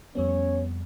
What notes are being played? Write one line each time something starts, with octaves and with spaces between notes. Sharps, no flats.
F2 G3 B3 C#4 C#5